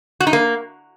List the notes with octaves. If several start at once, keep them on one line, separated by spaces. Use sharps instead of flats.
F#4
D#4
A#3